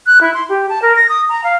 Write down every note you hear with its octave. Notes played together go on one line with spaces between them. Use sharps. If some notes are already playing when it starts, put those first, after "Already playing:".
F#6
E4
C6
G4
A5
A#4
A#6
D#6
A#5
F5